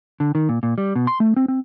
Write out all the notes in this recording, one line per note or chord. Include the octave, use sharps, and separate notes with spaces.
D3
D#3
A#2
A#2
G3
B2
C6
A3
C4
C4